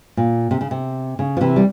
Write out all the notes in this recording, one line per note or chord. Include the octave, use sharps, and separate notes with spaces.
A#2
C3
C#3
C3
C#3
F3
C3 E3
G3